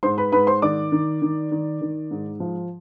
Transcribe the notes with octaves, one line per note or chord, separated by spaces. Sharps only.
G#2 C5 C6
B4 B5
G#2 B4 B5
C5 C6
D#3 D5 D6
D#3
D#3
D#3
D#3
G#2
F3